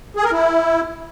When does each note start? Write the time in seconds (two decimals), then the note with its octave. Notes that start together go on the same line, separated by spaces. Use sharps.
0.17 G#4
0.25 A#4
0.32 E4